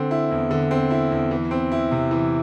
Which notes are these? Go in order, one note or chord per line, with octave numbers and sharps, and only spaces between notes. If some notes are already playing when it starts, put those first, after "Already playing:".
Already playing: D3 C4
E4
E2
D3
C4
E4
E2
E3
C4
E4
C3
E3